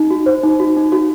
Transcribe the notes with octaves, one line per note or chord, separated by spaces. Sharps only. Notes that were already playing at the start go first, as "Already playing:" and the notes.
Already playing: D#4
F#4
C5
D#4
F#4
D#4
F#4